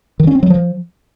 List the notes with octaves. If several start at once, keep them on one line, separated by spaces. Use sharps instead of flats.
D#3
C#4
C4
F#3
F3